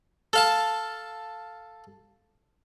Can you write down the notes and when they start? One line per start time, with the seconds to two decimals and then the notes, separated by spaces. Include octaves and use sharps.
0.33 A4 F5 A5